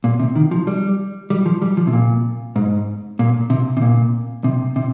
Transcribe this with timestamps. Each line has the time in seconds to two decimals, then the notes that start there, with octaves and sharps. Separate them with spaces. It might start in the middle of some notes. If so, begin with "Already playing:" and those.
0.04 A#2
0.20 C3
0.35 D#3
0.51 F3
0.67 G3
1.30 G3
1.46 F3
1.62 G3
1.77 F3
1.87 C3
1.93 A#2
2.56 G#2
3.19 A#2
3.50 C3
3.77 C3
3.82 A#2
4.44 C3
4.76 C3